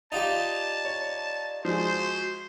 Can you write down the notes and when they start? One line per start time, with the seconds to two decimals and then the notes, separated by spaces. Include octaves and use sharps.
0.12 D#4 F4 G4 D5 A5
0.85 C#5
1.65 F3 G#3 F#4 C5